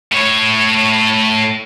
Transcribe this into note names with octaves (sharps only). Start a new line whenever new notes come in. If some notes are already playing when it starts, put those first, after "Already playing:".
A2 C#5